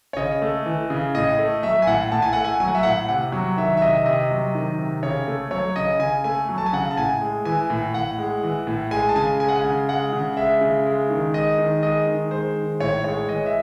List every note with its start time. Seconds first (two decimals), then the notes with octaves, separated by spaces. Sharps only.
0.13 C#5
0.17 C#3 D#5
0.42 A3
0.66 E3
0.90 C#3
1.15 A2 D#5
1.39 A3
1.63 F#3 E5
1.82 G#5
1.87 A2 F#5
2.12 A2 A5
2.22 G#5
2.33 A3 F#5
2.45 G#5
2.60 F#3 G#5
2.68 F#5
2.75 E5
2.83 A2 F#5
3.08 C3 F#5
3.32 F#3
3.57 D#3 E5
3.77 E5
3.82 C3 D#5
3.94 E5
4.06 C3 D#5
4.31 F#3
4.55 D#3
4.78 C3
5.03 C#3 C#5
5.27 A3
5.51 F#3 C#5
5.76 C#3 D#5
5.99 C#3 G#5
6.24 A3 G#5
6.49 F#3
6.58 A5
6.66 G#5
6.73 C#3 F#5
6.90 A5
6.97 A2 G#5
7.21 G#3
7.45 E3 G#5
7.70 A2
7.94 A2 F#5
8.18 G#3
8.43 E3
8.67 A2
8.91 G#3 G#5
9.09 A5
9.16 C#3 G#5
9.40 G#3 G#5
9.49 F#5
9.56 G#5
9.64 C#3
9.89 G#3 F#5
10.13 C#3
10.37 G#3 E5
10.61 C#3
10.86 G#3
11.10 D#3
11.34 G#3 D#5
11.59 D#3
11.83 G#3 D#5
12.07 D#3
12.31 G#3 C5
12.56 D#3
12.80 A2 C#5
13.04 G#3 C#5
13.29 E3 D#5
13.46 E5